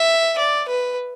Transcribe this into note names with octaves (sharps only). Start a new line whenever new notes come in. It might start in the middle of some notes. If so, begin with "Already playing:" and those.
Already playing: E5
D5
B4